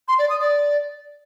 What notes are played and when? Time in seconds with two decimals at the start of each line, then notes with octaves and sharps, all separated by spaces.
0.08 C6
0.19 D5
0.30 D#6
0.40 D5